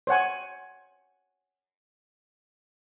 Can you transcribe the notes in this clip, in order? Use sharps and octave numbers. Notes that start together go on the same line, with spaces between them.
C5 C#5 F#5 G#5